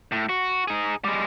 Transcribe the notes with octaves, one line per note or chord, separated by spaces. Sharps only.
A2
F#4
D#4 G#4
G3 G#3